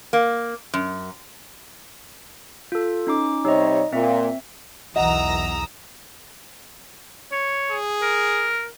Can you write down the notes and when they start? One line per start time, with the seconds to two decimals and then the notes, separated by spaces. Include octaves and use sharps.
0.13 A#3
0.74 F#2
2.72 F4 A4
3.07 C#4 D#4 D6
3.45 C3 G3 D#4 C#5 D#5
3.92 A#2 C4 E5
4.96 B1 E2 E3 D#5 F#5 A#5 D#6 E6
7.32 C#5
7.72 G#4
8.02 A#4